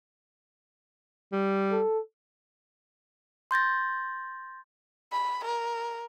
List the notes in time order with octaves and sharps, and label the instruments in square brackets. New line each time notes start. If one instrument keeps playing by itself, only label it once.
[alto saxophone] G3
[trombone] A4
[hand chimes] C6 G6 A6 A#6
[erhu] B5
A#4